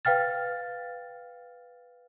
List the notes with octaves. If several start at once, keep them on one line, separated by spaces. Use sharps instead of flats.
B4 F5 G5 F6 A6